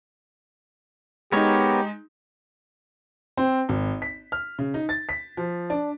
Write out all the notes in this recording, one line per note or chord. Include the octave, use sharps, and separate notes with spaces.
G#3 B3 D#4 G4 A#4 C#5
C4
G#1
B6
F6
C#3
D#4
A6
B6
F3
D4